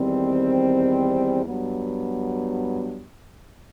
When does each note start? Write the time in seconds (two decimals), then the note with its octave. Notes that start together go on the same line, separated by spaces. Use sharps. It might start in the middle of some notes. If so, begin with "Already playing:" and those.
Already playing: E2 D#3 G3 C4
1.45 G2 F#3 B3